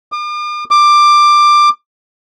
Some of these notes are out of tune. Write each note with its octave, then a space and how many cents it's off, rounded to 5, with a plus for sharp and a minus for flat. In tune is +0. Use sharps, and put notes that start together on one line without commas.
D6 +45
D6 +15